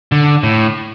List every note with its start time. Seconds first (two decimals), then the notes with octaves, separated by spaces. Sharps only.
0.12 D3
0.43 A2